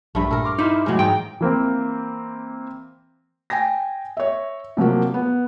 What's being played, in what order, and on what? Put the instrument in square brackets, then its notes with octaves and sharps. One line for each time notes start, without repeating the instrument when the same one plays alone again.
[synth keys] A#1 F3 B5 [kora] G2 A3
[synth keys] A#2 [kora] A4 A#4
[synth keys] C6 D6 F6
[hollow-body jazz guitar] D#4 E4
[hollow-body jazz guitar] C2 A2 [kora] F#3 G#3
[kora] G#2 D#4 [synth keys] E3 [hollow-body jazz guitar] G5
[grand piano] E3 A#3 C4
[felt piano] G5 G#5 A#6
C#5 E5
C3 F3 F#3 A#3
B3